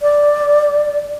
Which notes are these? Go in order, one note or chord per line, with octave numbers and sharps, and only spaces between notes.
D5